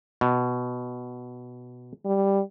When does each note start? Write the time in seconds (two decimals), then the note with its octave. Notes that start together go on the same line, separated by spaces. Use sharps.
0.21 B2
2.06 G3